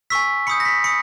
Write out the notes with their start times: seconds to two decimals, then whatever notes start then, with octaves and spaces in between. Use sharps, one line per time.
0.10 G#5 C#6 E6 B6
0.47 B5 D#6 G6 C#7
0.60 A#6
0.65 B6
0.84 B5 D#6 C#7